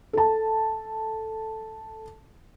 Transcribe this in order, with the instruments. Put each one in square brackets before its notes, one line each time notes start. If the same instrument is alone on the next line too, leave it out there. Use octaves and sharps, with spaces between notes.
[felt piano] A4 A5